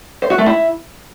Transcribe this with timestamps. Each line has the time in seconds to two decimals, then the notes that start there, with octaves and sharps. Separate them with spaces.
0.22 C5
0.30 F#4
0.38 A3
0.46 E4